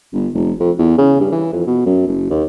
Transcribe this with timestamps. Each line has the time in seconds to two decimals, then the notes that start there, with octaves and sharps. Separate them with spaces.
0.13 G1
0.34 F1
0.60 F2
0.79 E2
0.98 C#3
1.20 G2
1.32 E3
1.53 F2
1.67 B2
1.86 F#2
2.08 F#1
2.30 D#2